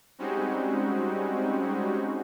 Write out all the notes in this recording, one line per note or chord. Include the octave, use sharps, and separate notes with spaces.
G3 G#3 C4 C#4 D#4 F#4